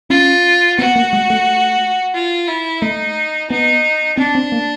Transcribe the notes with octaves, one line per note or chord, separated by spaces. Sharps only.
C#4 F4
B3 F#4
A#3
G#3
A3
F4
E4
A3 D#4
B3 D#4
C4 D4
C4
A#3